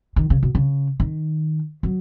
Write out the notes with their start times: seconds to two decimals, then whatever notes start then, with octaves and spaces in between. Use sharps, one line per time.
0.16 D#3
0.30 C#3
0.43 B2
0.55 C#3
1.00 D#3
1.83 F#3